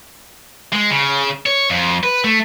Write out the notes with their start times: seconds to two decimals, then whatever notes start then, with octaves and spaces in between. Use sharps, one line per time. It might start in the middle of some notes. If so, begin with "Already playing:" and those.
0.73 G#3
0.91 C#3
1.46 C#5
1.70 F2
2.04 B4
2.24 A3